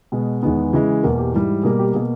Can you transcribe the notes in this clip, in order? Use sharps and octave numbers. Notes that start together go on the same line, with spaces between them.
B2 G#3 B3
E2 D#3 G#3 B3
C#3 E3 G#3
E2 B2 A#3 A#4
G4
G#2 E3 G3
B2 G3 A#3 G#4
G4
B2 A#3 G#4